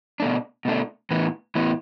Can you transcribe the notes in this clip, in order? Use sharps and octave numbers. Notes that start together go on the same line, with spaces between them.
B2 A3 D4
B2 A3 D4
A2 E3 B3
A2 E3 B3